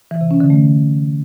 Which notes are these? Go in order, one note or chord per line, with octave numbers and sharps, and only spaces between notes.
E3
C3
C#4
D3
A3